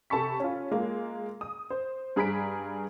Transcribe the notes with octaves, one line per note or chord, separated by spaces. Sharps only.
C3 A4 A5 B5 C#6 B6
C#4 F4
G#3 A#3 F4
D#6
C5
G2 G#4 A#5 B5 B6 D7